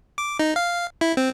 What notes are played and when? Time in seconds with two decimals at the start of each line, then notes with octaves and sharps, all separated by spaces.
0.18 D6
0.39 D#4
0.56 F5
1.01 E4
1.17 C4